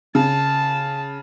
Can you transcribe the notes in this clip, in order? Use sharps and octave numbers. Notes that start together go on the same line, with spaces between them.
C#3 A5